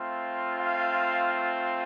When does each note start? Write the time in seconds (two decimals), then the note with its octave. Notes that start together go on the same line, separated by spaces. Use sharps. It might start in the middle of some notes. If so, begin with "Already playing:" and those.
Already playing: A3 C4 F4
0.58 F5